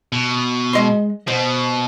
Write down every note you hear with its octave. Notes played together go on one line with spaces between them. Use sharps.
B2
G#3 D#5 C6
B2 C5